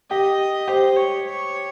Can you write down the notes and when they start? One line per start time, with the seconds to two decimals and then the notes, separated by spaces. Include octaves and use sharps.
0.11 G4 D#5
0.68 G4 C5
0.96 C#5
1.26 C#5